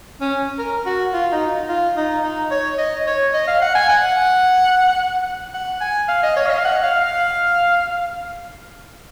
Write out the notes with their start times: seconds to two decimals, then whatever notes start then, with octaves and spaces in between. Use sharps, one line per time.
0.21 C#4
0.58 A#4
0.86 F#4
1.14 F4
1.32 D#4
1.69 F4
1.97 D#4
2.23 D#4
2.51 C#5
2.78 D#5
3.06 C#5
3.34 D#5
3.48 F5
3.62 F#5
3.75 G#5
3.89 F#5
5.54 F#5
5.81 G#5
6.09 F5
6.23 D#5
6.37 C#5
6.46 F5
6.50 D#5
6.58 F5
6.65 F#5
6.83 F5
7.01 F5